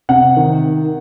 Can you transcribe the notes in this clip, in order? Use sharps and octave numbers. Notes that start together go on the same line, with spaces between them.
C3 F#5
D#3